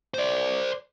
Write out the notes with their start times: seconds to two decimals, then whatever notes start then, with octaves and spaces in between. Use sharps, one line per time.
0.14 C5 D5